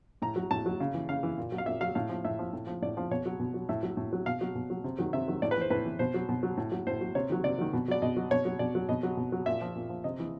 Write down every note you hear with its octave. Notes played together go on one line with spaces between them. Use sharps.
A2 A#5
F#3
A2 A5
F#3
C#3
E3
C#3 F5
E3
A#2
F#3
F5
A#2 E5
F#3 F5
A2 F5
F3
A2 E5
F3
A2
F3
A2 D5
F3
B2 C#5
F#3
B2
F#3
A2 E5
F#3
A2
F#3
B2 F5
F#3
B2
F#3
C3
D#3 F#3
C3 E5
D#3 F#3
A2 D5
B4
E3 C5
A2 B4
E3
B2 C5
F#3
B2
F#3
A2
F#3
A2 C5
F#3
C3 C#5
D#3 F#3
C3 D5
D#3 F#3
B2
F#3 D5
B2 D#5
F#3
B2 C#5
F#3
B2 D5
F#3
B2 D#5
F#3
B2
F#3
A#2 E5
F3
A#2
F3
C3 D#5
E3